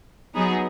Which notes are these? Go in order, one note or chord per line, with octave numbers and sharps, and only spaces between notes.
F#3 B3 D#4 G#4